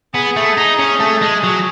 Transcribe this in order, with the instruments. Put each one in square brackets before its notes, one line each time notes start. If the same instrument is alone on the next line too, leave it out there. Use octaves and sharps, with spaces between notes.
[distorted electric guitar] B3 [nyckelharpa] G#4
[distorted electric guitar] A3
D#4
C#4
A3
G#3
F#3